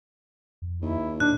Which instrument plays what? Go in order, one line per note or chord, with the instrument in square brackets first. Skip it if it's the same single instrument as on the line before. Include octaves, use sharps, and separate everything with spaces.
[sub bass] F2
[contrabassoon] D#2 [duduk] E4
[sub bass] A#2 [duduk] D4 [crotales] F#6